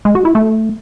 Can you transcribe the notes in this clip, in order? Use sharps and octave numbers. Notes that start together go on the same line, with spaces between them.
G#3
F#4
E4
A3